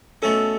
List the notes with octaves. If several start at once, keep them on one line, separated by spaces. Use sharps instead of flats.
B2 A3 C#4 A4